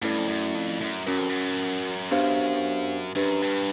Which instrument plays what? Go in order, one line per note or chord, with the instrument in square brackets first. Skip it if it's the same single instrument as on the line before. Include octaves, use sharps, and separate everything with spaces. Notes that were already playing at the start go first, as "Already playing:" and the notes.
[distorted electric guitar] G2 [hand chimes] A3 C#4 E4 A4 D5
[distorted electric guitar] F2
F#2
F2
F#2
[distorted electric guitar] F#2 [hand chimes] C#4 F#4 A#4
[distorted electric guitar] F2
F#2
[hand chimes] B3 D4 G4 C5 F5
[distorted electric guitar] F#2 [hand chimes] D4 G4 B4
[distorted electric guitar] G2